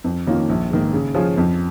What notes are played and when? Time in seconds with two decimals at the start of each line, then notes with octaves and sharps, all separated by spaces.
0.04 F2
0.27 D#3 A#3 C#4 F4
0.49 A#1
0.71 G#2 D#3 A#3
0.93 C#3
1.14 F3 C#4 F4 G#4
1.38 F2